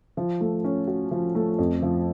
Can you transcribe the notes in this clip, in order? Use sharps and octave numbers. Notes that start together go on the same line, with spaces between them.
F3
A3
C#4
F#4
F3
A3
F2
F3